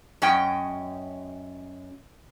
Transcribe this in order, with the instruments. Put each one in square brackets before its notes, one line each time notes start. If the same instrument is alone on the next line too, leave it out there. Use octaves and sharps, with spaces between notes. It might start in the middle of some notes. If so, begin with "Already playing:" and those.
[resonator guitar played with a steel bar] F#2 C#4 D#5 G5